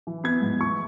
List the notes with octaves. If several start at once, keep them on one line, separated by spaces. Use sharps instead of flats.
E3
B3 G#6
G#2
E3 C#6